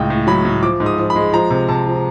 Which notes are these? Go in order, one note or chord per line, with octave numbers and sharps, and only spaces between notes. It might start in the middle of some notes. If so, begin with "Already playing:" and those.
Already playing: C#2 A2 G5
A2
F#3 B5
A2
F3 D6
G#2
D#6
F3
B5
G#3
F3 A#5
C3
C3 A5
F3